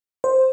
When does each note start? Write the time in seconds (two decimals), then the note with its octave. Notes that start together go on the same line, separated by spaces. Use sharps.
0.24 C5